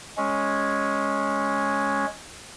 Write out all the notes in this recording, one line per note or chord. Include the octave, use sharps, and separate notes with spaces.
G#3 C#4